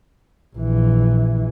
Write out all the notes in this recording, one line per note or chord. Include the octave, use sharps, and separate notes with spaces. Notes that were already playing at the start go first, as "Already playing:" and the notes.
A#1 E3